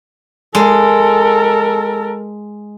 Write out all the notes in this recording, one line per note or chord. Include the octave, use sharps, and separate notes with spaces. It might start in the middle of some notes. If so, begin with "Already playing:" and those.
G#3 A4 A#4